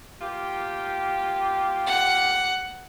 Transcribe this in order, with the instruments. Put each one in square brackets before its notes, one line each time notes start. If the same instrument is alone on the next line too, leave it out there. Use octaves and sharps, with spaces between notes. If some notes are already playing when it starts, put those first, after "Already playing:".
[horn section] A#3 F4 G4
[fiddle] F#5